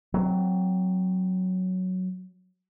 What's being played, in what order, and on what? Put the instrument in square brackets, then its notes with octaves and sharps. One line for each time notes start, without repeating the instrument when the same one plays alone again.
[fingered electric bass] F#3 C4